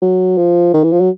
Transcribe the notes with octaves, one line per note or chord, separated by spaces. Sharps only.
F#3
F3
D#3
E3
F3
F#3